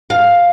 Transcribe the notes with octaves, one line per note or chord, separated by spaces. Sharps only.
F5